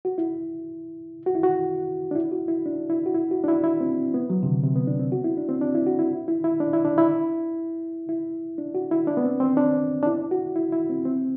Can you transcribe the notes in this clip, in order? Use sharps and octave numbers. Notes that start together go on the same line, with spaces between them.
F#4
E4
F#4
E4
F#4
D4
E4
F#4
E4
D4
E4
F#4
E4
F#4
D4
E4
E4
C4
B3
F#3
C3
D3
C3
B3
D4
C4
F#4
E4
D4
C4
D4
E4
F#4
E4
E4
E4
D4
E4
D4
E4
E4
D4
F#4
E4
D4
B3
C4
C4
D4
D4
E4
F#4
E4
E4
C4
C4